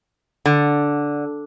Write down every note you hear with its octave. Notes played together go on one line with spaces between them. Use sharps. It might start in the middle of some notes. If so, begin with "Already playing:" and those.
D3